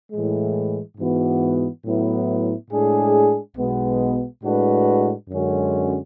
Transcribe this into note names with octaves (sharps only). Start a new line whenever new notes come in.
A2 E3 G#3
G#2 E3 B3 F#4
A2 F#3 B3 E4
A2 G#3 D4 G#4
B1 B2 G#3 B3
A2 G#3 D4 F#4 B4
F#2 D3 G#3 C#4 F#4